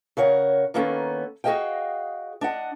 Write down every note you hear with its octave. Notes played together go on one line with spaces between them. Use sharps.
C#3 A#4 C#5 F#5
D#3 A#3 B3 C#4 A4
F#4 G#4 C5 D#5 F5 G5
D4 D#5 F#5